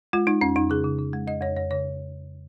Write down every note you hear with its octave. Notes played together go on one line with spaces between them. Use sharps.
G#3 F4
G#3 D#4
F2 C#4
F2 D#4
C#3 G#4
C#3
C#3
G#3
F2 D#5
F2 C#5
F2 C#5
C#3 C#5